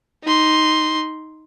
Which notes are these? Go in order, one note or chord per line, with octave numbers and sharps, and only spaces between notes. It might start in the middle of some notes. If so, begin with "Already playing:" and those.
D#4 C6